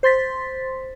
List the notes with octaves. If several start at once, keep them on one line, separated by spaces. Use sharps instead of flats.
C5 C6 A6 B6